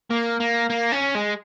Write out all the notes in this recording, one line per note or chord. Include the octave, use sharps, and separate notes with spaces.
A#3
A#3
A#3
C#4
G#3